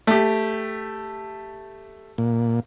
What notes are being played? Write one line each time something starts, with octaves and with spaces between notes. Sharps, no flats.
A3 G4
A#2